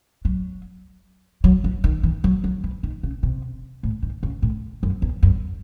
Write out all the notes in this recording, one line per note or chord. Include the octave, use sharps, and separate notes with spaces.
F#3
F#3
E3
D#3
E3
F#3
F#3
E3
D#3
C#3
C3
A2
D#3
C#3
A2
F#2
E2
F#2